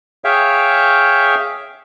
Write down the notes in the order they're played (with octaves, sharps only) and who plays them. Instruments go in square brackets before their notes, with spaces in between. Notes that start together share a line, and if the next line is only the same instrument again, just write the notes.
[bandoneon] G#4 C#5 E5 F5 G5